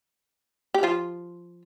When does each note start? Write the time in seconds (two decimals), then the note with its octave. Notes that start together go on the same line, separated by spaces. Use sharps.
0.74 G4
0.83 F3 F4